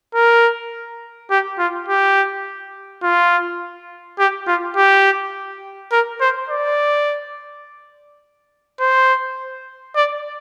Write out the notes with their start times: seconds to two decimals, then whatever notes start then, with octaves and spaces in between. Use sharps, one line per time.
0.15 A#4
1.30 G4
1.59 F4
1.88 G4
3.03 F4
4.19 G4
4.47 F4
4.76 G4
5.92 A#4
6.21 C5
6.49 D5
8.80 C5
9.95 D5